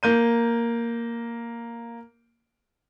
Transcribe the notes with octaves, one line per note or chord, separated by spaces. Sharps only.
A#3 G6 D#7